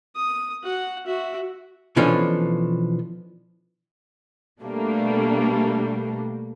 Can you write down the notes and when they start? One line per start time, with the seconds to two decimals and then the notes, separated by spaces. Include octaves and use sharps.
0.15 D#6
0.62 F#4 F#5
1.06 F#4 E5
1.96 B2 E3 F3 C#4 D4 A4
4.62 B2 G3 A3 A#3 D4